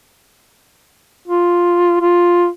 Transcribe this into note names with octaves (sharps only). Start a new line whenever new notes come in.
F4
F4